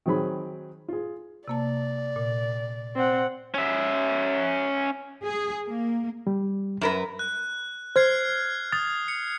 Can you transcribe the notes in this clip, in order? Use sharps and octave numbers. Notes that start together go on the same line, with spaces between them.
D#3 F#3 C4 G#4 B5
F4 G#4
C3 A#3 D5 A5
A#2
C4 F#5
C#4 E5
G#4
A#3
G3
F#2 A#4 B4
F#6
C5 F6 G#6 C7
D#6 A6
C#7